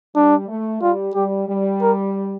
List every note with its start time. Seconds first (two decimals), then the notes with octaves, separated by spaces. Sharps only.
0.15 G3 D4
0.48 A3
0.82 G3 F4
1.14 G3 G4
1.48 G3
1.82 A#4